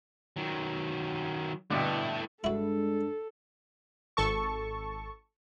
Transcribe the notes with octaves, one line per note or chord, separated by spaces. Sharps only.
D#3 F#3
G2 B2 D3 A3 E4
G2 G#3 D4 E4 F#4 A4 B4
G#1 A4 A5 C#6